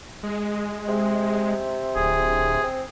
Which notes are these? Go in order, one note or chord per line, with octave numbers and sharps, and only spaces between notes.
G#3
C3
D1 G#4
C4